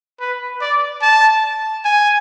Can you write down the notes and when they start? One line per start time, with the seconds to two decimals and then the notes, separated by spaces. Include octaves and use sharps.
0.20 B4
0.61 D5
1.02 A5
1.85 G#5